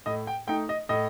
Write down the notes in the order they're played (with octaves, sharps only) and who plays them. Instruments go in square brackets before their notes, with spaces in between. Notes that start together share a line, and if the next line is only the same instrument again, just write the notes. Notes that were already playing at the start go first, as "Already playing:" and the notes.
[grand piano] A2 D#5
G5
A3 D#4 G5
D#5
A2 D#5